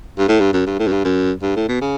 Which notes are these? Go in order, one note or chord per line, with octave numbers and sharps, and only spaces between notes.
G2
A2
G2
F#2
G2
A2
F#2
G2
F#2
G2
A2
B2
C#3